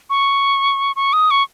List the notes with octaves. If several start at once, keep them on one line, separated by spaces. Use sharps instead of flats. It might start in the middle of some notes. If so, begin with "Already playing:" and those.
C#6
C#6
D#6
C#6